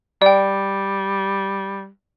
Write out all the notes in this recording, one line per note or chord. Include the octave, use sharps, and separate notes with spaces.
G3 D5 G5